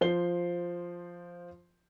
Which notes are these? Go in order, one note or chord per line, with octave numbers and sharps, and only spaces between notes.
F3 C5 C7 G7